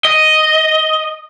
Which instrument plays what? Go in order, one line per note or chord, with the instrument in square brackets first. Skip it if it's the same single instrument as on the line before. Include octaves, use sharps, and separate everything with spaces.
[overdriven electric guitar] D#5